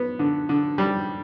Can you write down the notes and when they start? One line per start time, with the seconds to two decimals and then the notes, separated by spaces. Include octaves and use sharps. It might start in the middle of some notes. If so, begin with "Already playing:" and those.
Already playing: B3
0.19 D3
0.49 D3
0.78 G3